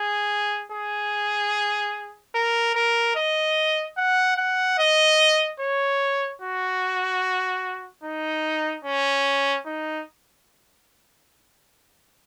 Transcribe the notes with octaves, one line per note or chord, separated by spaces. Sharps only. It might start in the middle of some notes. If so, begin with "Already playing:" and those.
Already playing: G#4
G#4
A#4
A#4
D#5
F#5
F#5
D#5
C#5
F#4
D#4
C#4
D#4